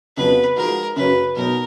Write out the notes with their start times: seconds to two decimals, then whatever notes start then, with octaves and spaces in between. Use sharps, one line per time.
0.17 F2 C#3 F#3 B3 B4
0.56 F3 G#3 D#4 F#4 A#4
0.96 F#2 C#3 F#3 C#4 F#4 B4
1.36 B2 F#3 B3 D#4 A#4